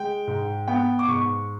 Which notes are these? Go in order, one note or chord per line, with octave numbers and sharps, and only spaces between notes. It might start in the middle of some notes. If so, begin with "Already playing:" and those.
Already playing: G#3 G5
G#2
B3 G5
D6
G#2 C#6